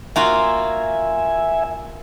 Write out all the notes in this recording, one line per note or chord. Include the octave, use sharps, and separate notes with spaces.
A#3 F4 F#4 E5 G#5